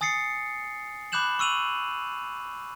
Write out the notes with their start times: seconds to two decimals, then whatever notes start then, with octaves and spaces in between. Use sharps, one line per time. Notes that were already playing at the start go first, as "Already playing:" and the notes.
0.01 G#5 D#6 A6 C7 C#7
1.12 B5 D6 F#6 G6 E7 F#7
1.39 C#6 E6 D#7 F7 F#7